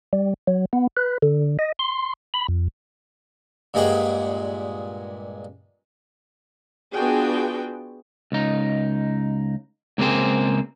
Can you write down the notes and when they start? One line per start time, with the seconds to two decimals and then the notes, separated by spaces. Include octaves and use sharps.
0.13 G3
0.47 F#3
0.73 B3
0.97 B4
1.22 D3
1.59 D#5
1.79 C6
2.34 B5
2.48 F2
3.74 G2 A#2 G#3 G#4 F#5 G5
6.93 B3 D4 F4 F#4 G#4 G5
8.32 C#2 D#4
9.98 C#2 A#3 C4 G#4 C5